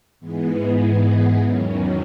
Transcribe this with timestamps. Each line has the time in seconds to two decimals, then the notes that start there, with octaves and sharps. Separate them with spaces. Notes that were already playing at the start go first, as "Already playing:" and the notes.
0.20 G#2 E3 G#3 B3
1.38 E2 D#3 F#3 C#4